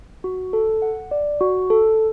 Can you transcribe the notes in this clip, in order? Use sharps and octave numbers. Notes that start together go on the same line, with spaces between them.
F#4
A4
F#5
D5
F#4
A4